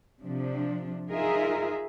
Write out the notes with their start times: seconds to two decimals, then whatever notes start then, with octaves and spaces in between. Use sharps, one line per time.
0.24 C3 F3 D4
1.11 D#4 F4 G#4 A#4 E5